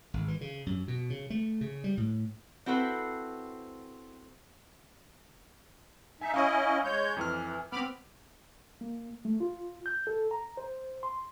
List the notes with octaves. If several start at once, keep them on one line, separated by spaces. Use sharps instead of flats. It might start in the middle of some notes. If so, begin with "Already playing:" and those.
G#1
E3
C#3
F#2
B2
C#3
A3
C#3
G3
A2
C4 E4 F#4 A4 B4 C5
D#4 E5 G#5
C#4 E4 D#5 F5 C#6 D#6
G#3 C#5 G6
F2 E3 E4 F6
B3 C4 B5 D6 F6
A#3
A3
F4
G6
A4
A#5
C5
C6